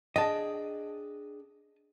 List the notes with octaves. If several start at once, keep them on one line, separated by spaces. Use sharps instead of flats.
D4 G#4 D#5 G5 A5